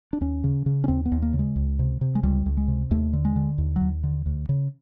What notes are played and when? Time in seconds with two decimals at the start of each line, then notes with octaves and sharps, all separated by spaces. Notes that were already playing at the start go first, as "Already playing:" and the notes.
0.13 D4
0.21 D#2 C#4
0.44 C#3
0.66 C#3
0.84 C#4
0.88 D#2 C4
1.06 B3
1.12 D#2
1.22 A#3
1.33 C#3
1.39 G#3
1.56 C#2
1.79 C3
2.01 C3
2.15 G#3
2.23 C#2 G3
2.46 C#2
2.57 G#3
2.68 C3
2.91 D#2 A3
3.13 D3
3.25 G#3
3.36 D3
3.58 D#2
3.76 F#3
3.81 D#2
4.03 D3
4.26 D2
4.49 C#3